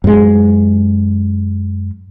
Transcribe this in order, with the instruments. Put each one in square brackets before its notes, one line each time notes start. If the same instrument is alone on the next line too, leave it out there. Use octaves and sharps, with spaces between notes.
[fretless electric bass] F#2 G#3